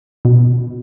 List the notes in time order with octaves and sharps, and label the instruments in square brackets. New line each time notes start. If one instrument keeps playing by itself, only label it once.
[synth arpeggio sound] B2